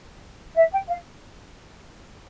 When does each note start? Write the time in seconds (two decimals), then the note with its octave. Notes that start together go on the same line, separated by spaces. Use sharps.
0.56 E5
0.71 G5
0.88 F5